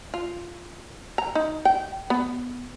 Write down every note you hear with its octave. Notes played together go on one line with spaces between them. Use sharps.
F4
A#5
D#4
G5
B3